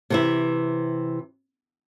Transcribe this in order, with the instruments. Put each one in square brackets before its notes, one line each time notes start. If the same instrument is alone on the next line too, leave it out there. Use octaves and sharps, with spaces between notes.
[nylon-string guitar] C3 E3 E4